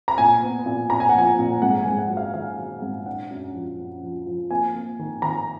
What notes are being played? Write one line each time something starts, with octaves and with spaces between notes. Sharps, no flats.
A#5
A#2 G#5
B3
A#2
A#2 A#5
G#5
F#5
F3 G#5
A#2
G#2 F#5
G#2 G#5
F#5
F#3
F5
D#3 F5
F#3
G#2
D4 F#5
F#2
F3
F#2
F3
F3
A#3 G#5
A#3
D#3
D#3 A#5